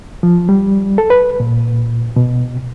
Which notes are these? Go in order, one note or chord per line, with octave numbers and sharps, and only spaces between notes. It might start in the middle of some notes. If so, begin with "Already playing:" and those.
F3
G3
A4
B4
A#2
B2